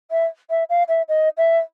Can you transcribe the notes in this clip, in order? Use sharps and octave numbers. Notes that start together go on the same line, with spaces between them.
E5
E5
F5
E5
D#5
E5